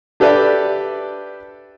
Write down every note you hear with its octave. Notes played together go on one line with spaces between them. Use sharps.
D4 G4 A4 B4 D5 E5